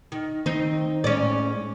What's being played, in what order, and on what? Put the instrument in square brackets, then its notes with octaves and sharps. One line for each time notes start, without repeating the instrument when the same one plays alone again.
[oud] D#3
[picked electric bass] D#3 [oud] C4 D#4
[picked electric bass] A2 G#3 [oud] C#4 D5